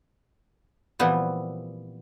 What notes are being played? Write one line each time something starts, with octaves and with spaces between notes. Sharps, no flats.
A#2 E3 F3 G3 B3 C4